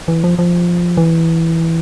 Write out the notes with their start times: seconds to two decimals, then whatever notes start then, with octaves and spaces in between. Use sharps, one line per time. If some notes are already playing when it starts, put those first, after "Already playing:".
0.08 E3
0.24 F3
0.39 F3
0.97 E3